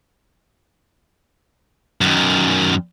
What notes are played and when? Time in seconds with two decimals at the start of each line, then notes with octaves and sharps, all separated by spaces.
2.01 F#2 D#3